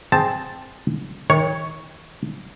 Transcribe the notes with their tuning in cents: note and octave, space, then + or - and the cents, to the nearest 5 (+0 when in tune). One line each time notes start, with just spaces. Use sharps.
C4 +0 G#4 +0 A5 +0
D#3 +35 C#5 +0